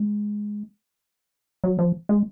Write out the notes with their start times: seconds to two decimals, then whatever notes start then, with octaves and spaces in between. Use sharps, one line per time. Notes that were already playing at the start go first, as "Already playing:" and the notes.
Already playing: G#3
1.64 F#3
1.79 F3
2.09 G#3